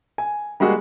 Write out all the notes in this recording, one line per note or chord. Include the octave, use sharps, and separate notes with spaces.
G#5
G3 G#3 A#3 F#4 G#4